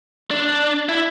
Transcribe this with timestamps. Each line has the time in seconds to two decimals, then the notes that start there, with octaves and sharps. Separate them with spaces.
0.31 D4
0.89 E4